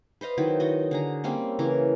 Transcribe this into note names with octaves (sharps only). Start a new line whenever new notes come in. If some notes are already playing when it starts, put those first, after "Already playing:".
B4 C5 D#5 F5
D#3 F#3 E4
D#3 F#4 D#5
D3 G#4 A#5
G3 A#3 C4 C#4
C#3 E3 A#4